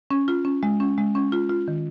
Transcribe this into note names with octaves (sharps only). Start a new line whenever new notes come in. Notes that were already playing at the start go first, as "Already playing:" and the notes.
C#4
F4
C#4
G#3
C#4
G#3
C#4
F4
F4
D#3